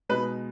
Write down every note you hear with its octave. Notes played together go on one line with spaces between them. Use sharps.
B2 G#3 B3 D#4 B4